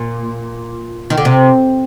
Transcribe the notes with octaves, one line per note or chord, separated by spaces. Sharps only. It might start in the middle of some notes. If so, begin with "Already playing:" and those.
Already playing: A#2
D#3
D3
C3